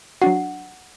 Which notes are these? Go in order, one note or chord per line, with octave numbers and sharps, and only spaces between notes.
F#3 D4 F#4 F#5